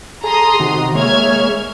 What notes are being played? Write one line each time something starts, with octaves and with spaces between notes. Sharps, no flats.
G#4 A4 A#5 C6 D#6
C3 D#3 F#4
G#3 A#3 C#5 E5 F6 G#6